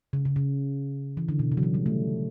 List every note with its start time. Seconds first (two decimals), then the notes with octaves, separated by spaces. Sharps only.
0.13 C#3
0.25 C#3
0.36 C#3
1.17 E3
1.29 D3
1.39 B2
1.52 C#3
1.57 F#3
1.63 E3
1.74 G3
1.86 A3